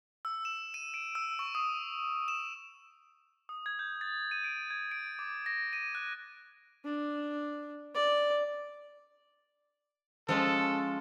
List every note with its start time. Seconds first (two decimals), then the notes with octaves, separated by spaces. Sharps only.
0.25 E6
0.45 E7
0.74 D#7
0.94 D7
1.15 E6
1.39 C#6
1.55 D#6
2.28 E7
3.49 D#6
3.66 G#6
3.79 G6
4.01 A6
4.31 D#7
4.44 D7
4.70 G#6
4.91 D7
5.19 D6
5.46 A#6
5.73 D#7
5.95 F#6
6.85 D4
7.95 D5
10.29 F3 G#3 C#4 A4